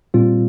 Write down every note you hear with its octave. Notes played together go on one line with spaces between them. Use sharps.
A#2 G3 C4 F4